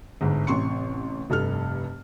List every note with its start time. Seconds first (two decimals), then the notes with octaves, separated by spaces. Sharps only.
0.21 G1 G#2
0.47 A1 C3 C6 C#6 C#7
1.30 F1 G2 A4 F6